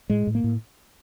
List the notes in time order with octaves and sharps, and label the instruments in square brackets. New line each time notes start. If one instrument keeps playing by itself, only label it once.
[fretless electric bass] A2 G#3
A2
A#3
A2